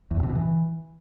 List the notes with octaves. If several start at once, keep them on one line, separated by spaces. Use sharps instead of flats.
E2
A2
C3
B2
E3